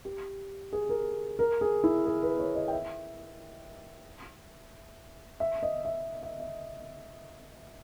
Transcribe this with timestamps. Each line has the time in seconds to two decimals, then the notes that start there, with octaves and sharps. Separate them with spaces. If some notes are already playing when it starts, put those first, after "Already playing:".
0.05 G4
0.73 G#4
0.89 A#4
1.39 A#4
1.61 G#4
1.84 E4
2.06 G#4
2.23 B4
2.39 C#5
2.55 D#5
2.68 G5
2.72 E5
5.40 E5
5.63 D#5
5.85 E5
6.23 E5
6.40 E5